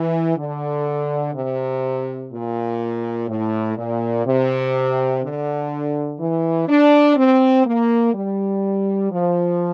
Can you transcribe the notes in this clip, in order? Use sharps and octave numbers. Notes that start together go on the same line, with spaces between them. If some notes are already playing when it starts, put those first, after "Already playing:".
Already playing: E3
D3
C3
A#2
A2
A#2
C3
D3
E3
D4
C4
A#3
G3
F3